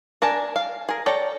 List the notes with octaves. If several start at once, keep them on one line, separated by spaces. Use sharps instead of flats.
D4 A#4 G#5 A5
F5
G#4 A#4
A4 C#5 D5 G5 A#5